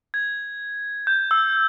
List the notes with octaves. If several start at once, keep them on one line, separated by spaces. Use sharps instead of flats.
G#6
G6
E6